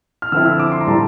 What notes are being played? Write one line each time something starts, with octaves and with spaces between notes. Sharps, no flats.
F6
D3 F3 C4 E4 E6
E6
D6
C6
A#5
A2 G3 D4 A5